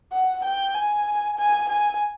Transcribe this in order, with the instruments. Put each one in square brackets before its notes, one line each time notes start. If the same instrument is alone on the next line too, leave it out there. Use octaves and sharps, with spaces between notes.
[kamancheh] F#5
G5
G#5
G#5
G#5